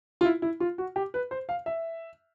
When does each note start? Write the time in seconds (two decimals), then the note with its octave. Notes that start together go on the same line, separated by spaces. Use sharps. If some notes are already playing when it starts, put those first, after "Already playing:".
0.21 F4
0.25 E4
0.42 E4
0.60 F4
0.78 F#4
0.96 G4
1.14 B4
1.31 C5
1.49 F5
1.66 E5